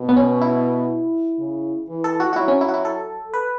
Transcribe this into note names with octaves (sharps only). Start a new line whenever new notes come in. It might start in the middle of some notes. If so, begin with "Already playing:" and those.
Already playing: B2
B3
C#4
E4
C#3
E3
A4
F#4
F#4
F#3 E4
C#4
E4
F#4
E4
A4
B4